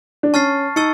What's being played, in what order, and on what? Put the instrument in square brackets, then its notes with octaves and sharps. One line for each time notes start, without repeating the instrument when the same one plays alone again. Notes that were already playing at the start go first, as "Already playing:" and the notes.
[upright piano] D4
[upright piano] C#4 [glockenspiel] A5 C#6 F6 A6 C7
[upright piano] D#4 [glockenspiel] A5 C#6 E6 A6 C#7